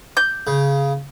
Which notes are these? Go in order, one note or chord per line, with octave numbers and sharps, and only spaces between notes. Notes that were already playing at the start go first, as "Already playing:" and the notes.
G6
C#3